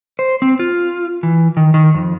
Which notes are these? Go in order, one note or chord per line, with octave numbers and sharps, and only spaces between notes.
C5
C4
F4
E3
D#3
D#3
F2